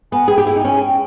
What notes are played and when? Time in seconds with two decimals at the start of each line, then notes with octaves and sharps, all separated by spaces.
0.12 B3 G#5
0.28 G#4 G5
0.38 G4
0.47 E4 G5
0.56 D#4
0.65 C#4 G#5
0.83 G5